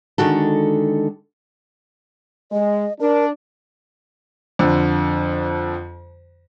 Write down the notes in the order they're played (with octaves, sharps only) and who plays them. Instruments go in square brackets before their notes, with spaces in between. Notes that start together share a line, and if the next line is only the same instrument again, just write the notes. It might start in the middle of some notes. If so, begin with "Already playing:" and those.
[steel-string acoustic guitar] D3 D#3 G#3 F#4 A4
[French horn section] G#3 [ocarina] D#5
[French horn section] D4 [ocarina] A#4
[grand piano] F2 D3